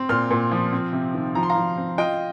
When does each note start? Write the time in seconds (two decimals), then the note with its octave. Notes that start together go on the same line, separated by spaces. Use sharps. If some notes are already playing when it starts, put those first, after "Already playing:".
Already playing: C4
0.09 A#2 C6 F6
0.31 A#2
0.52 F3
0.73 C4
0.93 C3
1.14 D#3
1.35 F3 A#5
1.43 C6
1.50 F5 A#5
1.56 F3
1.77 C4
1.98 F4 D#5 G5